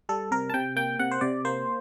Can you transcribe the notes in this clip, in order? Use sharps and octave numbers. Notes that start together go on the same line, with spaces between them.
G3 A4
C3 A#4
A5
C3 G5
A#3 G5
C3 F#5
C5
C3 D5
A#3 C5